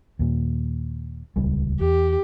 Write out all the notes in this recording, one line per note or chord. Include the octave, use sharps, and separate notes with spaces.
D#2 A#2
D#1 C#2 G3
E2 G4